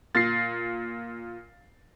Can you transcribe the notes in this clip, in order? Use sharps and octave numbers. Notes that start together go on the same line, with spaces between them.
A#2 A6 A#6 C7